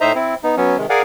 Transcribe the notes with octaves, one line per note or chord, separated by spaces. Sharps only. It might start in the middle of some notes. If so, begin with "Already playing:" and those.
A2 D#4 C5 D#5 E5 A#5
C4 E4
B3 D#4
F#3 B3 C#4
C3 D#3 G#3
G#4 A#4 D5 F5 F#5 G#5